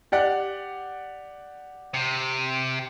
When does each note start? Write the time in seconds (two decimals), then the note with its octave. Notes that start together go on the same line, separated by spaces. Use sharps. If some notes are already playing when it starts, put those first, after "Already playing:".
0.12 G4 D5 F#5
1.94 C3